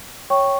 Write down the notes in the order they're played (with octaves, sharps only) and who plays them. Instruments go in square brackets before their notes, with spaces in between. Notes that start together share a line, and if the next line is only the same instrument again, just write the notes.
[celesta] C#5 G5 C#6